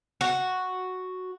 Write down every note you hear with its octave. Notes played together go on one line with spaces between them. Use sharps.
F#4